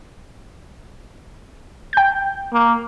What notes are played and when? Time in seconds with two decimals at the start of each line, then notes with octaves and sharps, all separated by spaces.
1.93 G5 G6
2.53 A#3